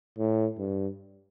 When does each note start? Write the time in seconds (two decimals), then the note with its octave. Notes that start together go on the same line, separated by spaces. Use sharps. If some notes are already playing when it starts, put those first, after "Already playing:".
0.18 A2
0.59 G2